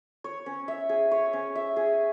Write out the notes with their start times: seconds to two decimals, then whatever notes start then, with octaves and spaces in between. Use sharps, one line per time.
0.24 C#5
0.46 C#4
0.68 E5
0.89 G#4
1.11 C#5
1.33 C#4
1.55 E5
1.76 G#4